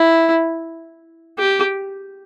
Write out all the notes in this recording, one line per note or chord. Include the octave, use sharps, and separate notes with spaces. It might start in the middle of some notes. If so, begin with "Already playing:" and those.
Already playing: E4
G4